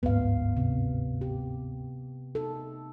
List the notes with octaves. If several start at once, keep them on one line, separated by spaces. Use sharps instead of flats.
G1 D2 G#2 B3 F5
C3
G4
D#4 A4